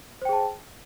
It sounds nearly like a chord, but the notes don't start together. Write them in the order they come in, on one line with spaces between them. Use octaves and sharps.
C5 G5 G#4 A5